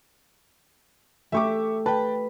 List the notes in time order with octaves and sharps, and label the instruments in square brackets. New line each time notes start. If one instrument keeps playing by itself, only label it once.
[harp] A3 G4 [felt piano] E5 C#6 D6
[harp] B4 [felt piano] G5 A5